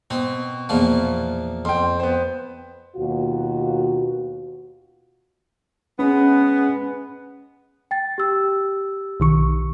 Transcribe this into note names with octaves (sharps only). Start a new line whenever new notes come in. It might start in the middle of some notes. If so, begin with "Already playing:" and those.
B2 C4
E2 A#2 F3
F2 G5 C6
B3 C5
D#2 B2 F4 F#4
G#3 B3 C#4
G5 A6
G4 E6
B1 D#3 C#6